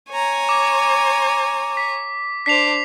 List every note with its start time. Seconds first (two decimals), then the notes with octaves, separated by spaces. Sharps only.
0.10 C#5 G#5 A#5
0.49 D6
1.77 B6
2.46 D4 C5 B6 C7 F7